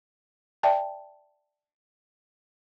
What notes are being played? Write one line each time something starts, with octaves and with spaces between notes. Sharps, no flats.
D5 E5 G5 A5